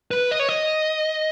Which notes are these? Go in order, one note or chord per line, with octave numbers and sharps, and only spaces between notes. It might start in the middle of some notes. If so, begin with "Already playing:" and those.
B4
D#5
C#5
D#5